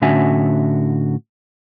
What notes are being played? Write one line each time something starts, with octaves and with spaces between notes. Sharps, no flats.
A2 D3 C#4 F#4 E5 G#5